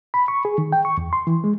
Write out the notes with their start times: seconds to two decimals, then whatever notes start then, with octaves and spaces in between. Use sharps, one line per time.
0.14 B5
0.28 C#6
0.45 G#4
0.58 D#3
0.73 G5
0.85 C#6
0.98 E2
1.13 C6
1.27 E3
1.44 G#3